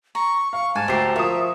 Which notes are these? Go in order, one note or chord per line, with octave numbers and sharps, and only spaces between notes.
A#5 C#6
F5 C#6
G#2 G#5 A5
D2 G4 A#4 C5 E5 G5 C7
F3 F4 A#4 C#5 E5 D#6